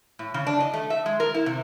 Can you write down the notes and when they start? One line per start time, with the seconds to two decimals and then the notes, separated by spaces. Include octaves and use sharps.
0.19 A2
0.34 C#3
0.47 D4
0.60 D#5
0.74 A3
0.90 E5
1.06 G#3
1.20 A#4
1.34 E4
1.46 C3